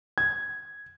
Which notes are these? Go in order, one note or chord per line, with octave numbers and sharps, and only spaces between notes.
G#6